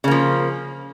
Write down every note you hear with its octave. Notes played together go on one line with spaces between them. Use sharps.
C#3 F3 A#3